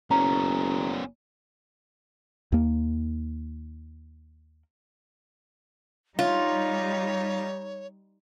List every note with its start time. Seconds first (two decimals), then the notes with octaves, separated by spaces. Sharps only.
0.11 F#1 B3 C#4 A#5
2.52 D#2 A#3
6.19 G3 D#4 F4 C#5